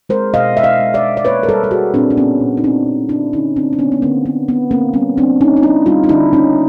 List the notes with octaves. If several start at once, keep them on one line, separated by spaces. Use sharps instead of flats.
G#3 A#4 C5
B2 D#5 F5
G#3 E5
D#5 F5
G#3
D5 E5
G#3
D5
A#3 B4 C#5
A#4
G3 A4 B4
A4
G3 F#4 G#4
A#2 C4 D4
D4
A#2 B3 C#4
A#2
D#4
A#3 C4 D4
A#2
D3 D4 E4
D3 C#4 D#4
A#3 C4 D4
D4
D3 B3 C#4
B3
D3 A#3 C4
A#3 B3
D3 B3
D3 A#3 C4
G3 B3 C#4
G3 C4 D4
G3 C#4 D#4
D#4
G3 D4 E4
G3 D#4 F4
D#4
D3 D4 E4
A#3 C#4 D#4